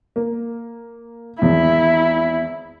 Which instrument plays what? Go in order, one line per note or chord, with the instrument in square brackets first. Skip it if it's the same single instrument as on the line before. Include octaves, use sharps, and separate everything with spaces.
[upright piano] A#3
[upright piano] G#1 E2 [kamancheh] E4